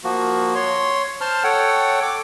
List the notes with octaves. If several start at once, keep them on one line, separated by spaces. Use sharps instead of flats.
F3 A#3 F#4
C#5 C6
C5 A5 C6 F6
A4 C#5 F#5 G5
D6